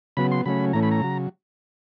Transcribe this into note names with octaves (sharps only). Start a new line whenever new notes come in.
C#3 F#3 B3 B5
C6
C#3 F#3 A3 C#4 B5
A2 E3 A3 C#4 A#5
B5
A#5
C#3 F#3